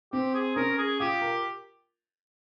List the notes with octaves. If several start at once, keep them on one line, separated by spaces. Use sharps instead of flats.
C4 G4
G#4
C#4 A#4
G#4
F4 G4
A#4